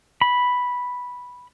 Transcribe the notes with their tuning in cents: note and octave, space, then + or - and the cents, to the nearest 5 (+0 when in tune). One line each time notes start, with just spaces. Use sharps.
B5 -5